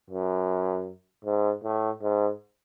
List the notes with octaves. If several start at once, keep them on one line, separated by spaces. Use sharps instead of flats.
F#2
G#2
A2
G#2